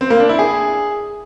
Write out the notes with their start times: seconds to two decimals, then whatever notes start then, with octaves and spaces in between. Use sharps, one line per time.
0.01 C4
0.10 A#3
0.20 D4
0.29 E4
0.39 G#4